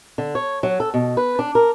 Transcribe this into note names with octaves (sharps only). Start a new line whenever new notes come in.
D3
C#5
F#3
A4
B2
B4
D4
A#4